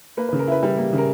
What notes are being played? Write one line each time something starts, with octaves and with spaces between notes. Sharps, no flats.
A#3 B4
C#3 B4
A#4
E4 B4
G3
A#3
C#3
A#4